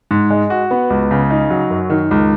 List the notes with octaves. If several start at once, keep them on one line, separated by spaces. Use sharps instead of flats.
G#2
G#3
F#4
B3
C#2
C#3
D#4
F#3
F#2
D#3
C#2